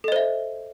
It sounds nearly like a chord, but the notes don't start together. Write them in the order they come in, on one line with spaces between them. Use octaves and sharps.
A4 D#5 C5 E5